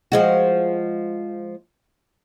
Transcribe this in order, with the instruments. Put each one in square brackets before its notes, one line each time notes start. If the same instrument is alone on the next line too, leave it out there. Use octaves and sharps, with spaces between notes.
[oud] F3 G#3 F#4